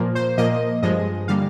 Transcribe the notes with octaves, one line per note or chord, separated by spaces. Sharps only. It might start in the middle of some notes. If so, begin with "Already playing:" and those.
Already playing: A#2 F3 A#3
C5
A#2 F3 A#3 D#5
G2 F3 G#3 D#5
D3 G3 A#3 F5